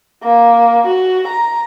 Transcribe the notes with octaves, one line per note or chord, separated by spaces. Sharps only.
A#3
F#4
A#5